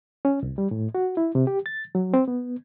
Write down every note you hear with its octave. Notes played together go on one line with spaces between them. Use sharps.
C#4
C2
G3
A2
F#4
E4
C3
G4
A6
F#3
C4
B3